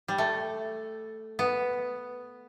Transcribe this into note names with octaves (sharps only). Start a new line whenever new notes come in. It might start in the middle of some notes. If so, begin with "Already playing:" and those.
G3
A3
B3